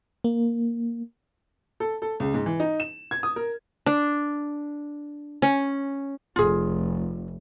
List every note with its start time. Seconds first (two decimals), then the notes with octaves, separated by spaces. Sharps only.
0.24 A#3
1.80 A4
2.02 A4
2.20 C#2
2.34 G#2
2.46 E3
2.60 D#4
2.80 E7
3.11 G#6
3.23 D#6
3.36 A#4
3.86 D4
5.42 C#4
6.36 F1 F4 G#4